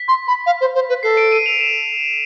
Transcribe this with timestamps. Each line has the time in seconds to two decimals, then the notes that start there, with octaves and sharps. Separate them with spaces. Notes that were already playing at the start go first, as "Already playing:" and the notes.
Already playing: B6
0.08 C6
0.28 B5
0.46 F5
0.61 C5
0.75 C5
0.89 B4
1.03 A4 C7
1.17 D7
1.32 D#7
1.46 F7
1.60 E7